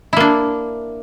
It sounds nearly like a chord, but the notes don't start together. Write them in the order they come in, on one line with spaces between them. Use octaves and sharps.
E4 A#3 D4